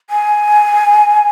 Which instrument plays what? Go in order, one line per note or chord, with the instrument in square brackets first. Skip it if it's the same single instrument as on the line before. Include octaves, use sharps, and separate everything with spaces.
[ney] G#5